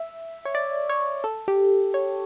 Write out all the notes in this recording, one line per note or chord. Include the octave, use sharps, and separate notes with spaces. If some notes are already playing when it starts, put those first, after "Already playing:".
Already playing: E5
C#5
D5
C#5
A4
G4
C#5